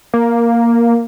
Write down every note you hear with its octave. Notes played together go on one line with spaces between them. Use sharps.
A#3